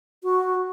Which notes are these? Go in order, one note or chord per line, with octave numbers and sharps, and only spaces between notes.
F#4